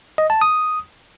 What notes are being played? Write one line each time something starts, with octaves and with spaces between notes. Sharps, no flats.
D#5
A5
D#6